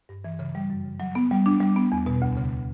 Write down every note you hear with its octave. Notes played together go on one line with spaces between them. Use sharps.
G2
E3
C#3
G3
F#2
C#3
F#3
B3
G3
D4
G3
B3
E2
B2
D2
C#3